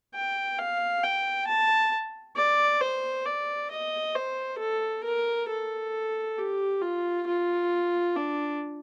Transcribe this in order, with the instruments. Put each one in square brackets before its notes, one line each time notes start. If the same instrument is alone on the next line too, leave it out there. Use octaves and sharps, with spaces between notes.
[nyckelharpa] G5
F5
G5
A5
D5
C5
D5
D#5
C5
A4
A#4
A4
G4
F4
F4
D4